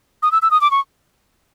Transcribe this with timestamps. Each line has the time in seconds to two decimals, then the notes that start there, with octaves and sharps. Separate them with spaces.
0.23 D#6
0.32 E6
0.42 E6
0.51 D#6
0.61 D6
0.71 C#6